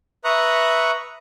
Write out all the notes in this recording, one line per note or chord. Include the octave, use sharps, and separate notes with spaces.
B4 E5 A#5 C#6 D#6 F#6